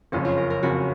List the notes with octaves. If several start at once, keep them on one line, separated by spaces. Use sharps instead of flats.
F#1 F2 C#3 C#4
F4
A#4
A#4
F#1 F2 C#3 F#4